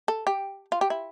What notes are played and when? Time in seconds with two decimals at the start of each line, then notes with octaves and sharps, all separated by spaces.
0.08 A4
0.27 G4
0.72 F4
0.81 G4
0.90 E4